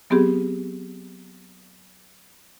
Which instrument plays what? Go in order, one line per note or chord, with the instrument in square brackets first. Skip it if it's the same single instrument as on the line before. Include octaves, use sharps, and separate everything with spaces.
[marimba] F#3 B3 C4 G4 G#4